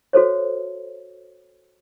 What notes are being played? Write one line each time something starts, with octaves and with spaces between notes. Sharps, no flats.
F#4 A4 C5 C#5